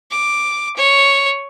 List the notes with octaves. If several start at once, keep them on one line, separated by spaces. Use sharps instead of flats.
D6
C#5